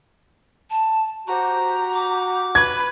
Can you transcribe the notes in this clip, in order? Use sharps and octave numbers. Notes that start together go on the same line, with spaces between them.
A5
F#4 G4 C5 A#5
D6
B4 G#6